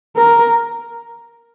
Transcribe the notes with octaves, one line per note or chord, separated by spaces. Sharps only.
A#4